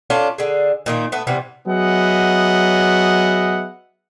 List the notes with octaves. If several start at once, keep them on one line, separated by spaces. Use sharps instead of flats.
C#4 D4 F4 A4
D3 G#4
A#2 D#3 A#3
A3 B3
C3 E3 G3 B3
F#3 B3 G#4 D#5 E5 F#5